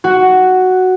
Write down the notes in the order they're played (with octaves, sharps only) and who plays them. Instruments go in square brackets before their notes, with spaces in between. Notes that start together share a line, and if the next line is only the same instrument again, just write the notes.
[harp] F#4